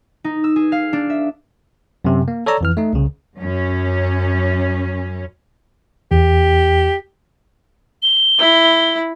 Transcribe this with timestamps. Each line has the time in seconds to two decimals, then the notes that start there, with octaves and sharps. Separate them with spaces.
0.24 D#4
0.44 E6
0.56 G#4
0.72 F5
0.93 D4
1.10 E5
2.05 F#2 C3
2.28 A#3
2.46 A4 C#5 D5 A#5 E6
2.61 F2 E3 F6
2.77 A3 D#4
2.93 C2 C#3
3.39 F#2 C#4
6.11 E2 G4
8.03 G7
8.39 E4